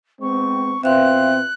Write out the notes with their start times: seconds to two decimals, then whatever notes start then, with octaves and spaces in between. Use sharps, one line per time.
0.21 G#3 B3 C4 C#6
0.83 B2 C4 F4 B4 E5 F5 C6 F#6